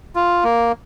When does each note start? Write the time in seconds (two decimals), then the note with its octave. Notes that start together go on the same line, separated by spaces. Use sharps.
0.16 F4
0.44 A#3